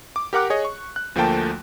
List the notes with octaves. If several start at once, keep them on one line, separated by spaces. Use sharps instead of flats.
D6
G4 A#4 F#5 D6 F#6
G#4 C#5 D#5
C#6
F#6
D2 F3 A3 A#3 G5 A5